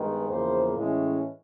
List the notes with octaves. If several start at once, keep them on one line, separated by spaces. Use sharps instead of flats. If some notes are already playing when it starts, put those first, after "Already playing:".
Already playing: G2 D#3 G#3 B3
E2 C#3 F3 A#3 C5
A2 E3 G#3 C#4